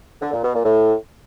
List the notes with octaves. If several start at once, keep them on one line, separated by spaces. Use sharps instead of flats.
D3
A#2
B2
A#2
A2